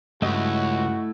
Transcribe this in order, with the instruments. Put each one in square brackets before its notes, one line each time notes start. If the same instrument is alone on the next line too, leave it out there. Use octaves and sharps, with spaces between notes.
[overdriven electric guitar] C#2 [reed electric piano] G2 D#5 [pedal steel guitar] A3 E4 [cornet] F#4